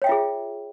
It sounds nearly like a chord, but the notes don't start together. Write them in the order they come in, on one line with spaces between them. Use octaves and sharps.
C#5 G5 E5 F4 G#4